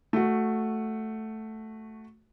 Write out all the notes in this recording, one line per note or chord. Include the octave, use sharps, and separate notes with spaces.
A3 F#4